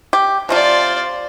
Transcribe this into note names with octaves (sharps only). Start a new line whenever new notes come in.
G4
C3 F3 F4 C5 D5